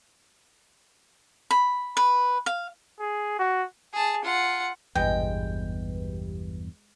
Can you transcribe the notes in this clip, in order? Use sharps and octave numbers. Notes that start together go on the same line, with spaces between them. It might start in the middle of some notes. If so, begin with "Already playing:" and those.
B5
B4
F5
G#4
F#4
G#4 A5
F4 F#5
G#1 E2 G2 B2 G#3 G4 B4 G5